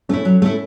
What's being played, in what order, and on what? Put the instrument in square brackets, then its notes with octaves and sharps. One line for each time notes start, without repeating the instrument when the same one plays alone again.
[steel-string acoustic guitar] A3 E4 [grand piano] C#4
[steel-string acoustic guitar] F#3
A3 E4